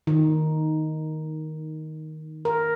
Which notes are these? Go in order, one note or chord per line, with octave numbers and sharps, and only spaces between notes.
D#3
A#4